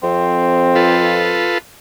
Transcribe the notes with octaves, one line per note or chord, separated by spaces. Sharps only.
F2 C4
F4 A4 B4